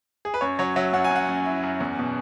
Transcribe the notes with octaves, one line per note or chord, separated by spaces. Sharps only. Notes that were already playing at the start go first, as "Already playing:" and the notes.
G#4
B4
F#2 C#5
F#3 C#5
F#3 E5
F#2 F#5
G#5
F#2 F#5
F#2
E4
F#2
E2
B2